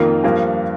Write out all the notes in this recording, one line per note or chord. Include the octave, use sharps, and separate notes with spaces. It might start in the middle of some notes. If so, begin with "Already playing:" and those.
Already playing: F2 D#3 A#3 F4
G2 F3 A#3